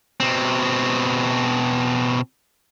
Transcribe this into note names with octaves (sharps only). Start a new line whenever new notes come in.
B2 C4